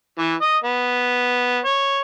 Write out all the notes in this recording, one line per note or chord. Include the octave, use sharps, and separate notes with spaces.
E3
D#5
B3
C#5